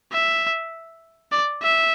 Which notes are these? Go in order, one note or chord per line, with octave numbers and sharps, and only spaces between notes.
E5
D5
E5